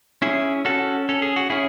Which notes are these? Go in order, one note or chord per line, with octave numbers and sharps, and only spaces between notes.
C#4 E4 G#4
C#4 F#4 A4
C#4 A4
G#4
F#4
C#4 E4 G#4